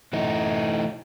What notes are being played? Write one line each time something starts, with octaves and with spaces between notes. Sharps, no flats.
E3 A3 D#4